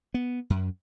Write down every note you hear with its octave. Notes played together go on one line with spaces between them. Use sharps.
B3
F#2